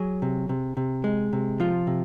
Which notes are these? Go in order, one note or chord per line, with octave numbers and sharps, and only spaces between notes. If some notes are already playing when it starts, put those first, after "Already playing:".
Already playing: F#3 G#4
C3
C3
C3
G#3
C3
F3 F4
C3